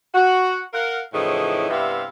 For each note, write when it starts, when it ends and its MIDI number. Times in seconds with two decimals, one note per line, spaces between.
0.14 0.60 66
0.74 1.00 70
0.74 1.00 77
0.74 1.00 78
1.14 1.69 45
1.14 1.69 49
1.14 1.69 52
1.14 1.69 53
1.14 1.69 63
1.14 1.69 64
1.70 2.04 43
1.70 2.04 48
1.70 2.04 59
1.70 2.04 64
1.70 2.04 76
1.70 2.04 77